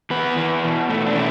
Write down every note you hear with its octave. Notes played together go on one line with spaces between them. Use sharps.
E3 B3 B4
E3
B2
A3
D4
E3 C#4 E4